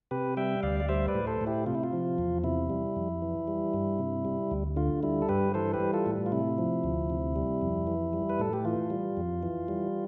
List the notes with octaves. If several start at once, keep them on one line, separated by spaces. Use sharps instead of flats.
C3 G4 B4
G3 E5 G5
D2 D5 F5
D5
G3 C5 E5
B4 D5
A2
A4 C5
A2
E4 G4
C3 F4
E4
F4
F3
E2
C3 E4
G3
F2
E3
G3
G2
C3
G3
D2
D3 F4
G3 E4
A4
G2 G4 B4
E3 A4 C5
G4 B4
G3
F4 A4
A2
F4
C3 E4
F3
D2
C3
G3
F2
E3
G3
B4
A2 A4
G4
E3 F4
G3
F2
E3
G3